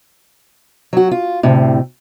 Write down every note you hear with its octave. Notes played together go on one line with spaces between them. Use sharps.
F#3 F#4
F4
D2 A2 C3